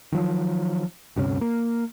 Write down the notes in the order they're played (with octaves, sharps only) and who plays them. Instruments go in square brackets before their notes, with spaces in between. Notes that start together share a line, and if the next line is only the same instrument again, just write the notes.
[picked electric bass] D#3 F3 F#3
D2 G2 C3 C#4
A#3